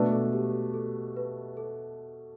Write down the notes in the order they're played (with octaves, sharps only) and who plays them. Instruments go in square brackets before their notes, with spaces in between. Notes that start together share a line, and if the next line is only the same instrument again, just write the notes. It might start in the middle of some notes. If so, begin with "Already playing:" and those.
Already playing: [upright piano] B2 A3 D4 [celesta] B4
[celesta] A4
G4
A4
A4
B4
A4